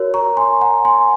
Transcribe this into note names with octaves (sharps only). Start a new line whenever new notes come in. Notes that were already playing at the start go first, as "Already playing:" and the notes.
Already playing: F#4 A#4 C#5
A#5 C#6
G#5 C6
F#5 A#5
G#5 C6